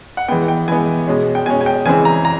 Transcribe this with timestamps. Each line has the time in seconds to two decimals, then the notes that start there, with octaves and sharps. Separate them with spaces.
0.17 F#5
0.28 E3 G#3 B3 G5
0.48 G5
0.68 E3 G#3 B3 G#5
1.07 B2 G#3 C#4
1.35 G5
1.46 B2 G#3 C#4 G#5
1.61 G#5
1.66 G5
1.85 C#3 E3 G#3 C4 G#5
2.05 A#5
2.25 A#5